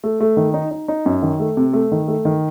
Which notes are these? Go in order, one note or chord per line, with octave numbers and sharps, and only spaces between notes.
A3
A3
D#3
D#4
D#4
D#4
F#2
D#3
A3
C3
A3
D#3
A3
D#3